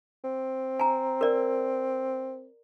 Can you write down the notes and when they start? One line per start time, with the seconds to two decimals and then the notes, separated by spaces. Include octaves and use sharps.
0.24 C4
0.79 G#5 A#5
1.21 A#4 D5